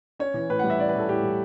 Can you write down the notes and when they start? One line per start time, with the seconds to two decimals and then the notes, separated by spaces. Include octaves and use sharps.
0.19 C#4 C#5
0.34 E3
0.50 A2 B4
0.59 F#5
0.64 G3
0.70 E5
0.79 C#4 D5
0.89 B4
0.95 E3 A4
1.09 A2 G4
1.23 G3